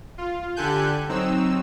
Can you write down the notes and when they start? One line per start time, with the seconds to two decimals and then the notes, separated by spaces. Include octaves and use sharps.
0.18 F4
0.56 D3 G4 A4 G#5 F#6 G6
1.09 F#3 C4 D#4 E6